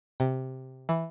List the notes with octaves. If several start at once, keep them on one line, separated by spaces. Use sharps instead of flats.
C3
E3